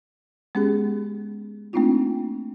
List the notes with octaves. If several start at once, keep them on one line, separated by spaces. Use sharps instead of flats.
G#3 B3 C#4 G4 G#4
A3 A#3 C4 D4 D#4 F4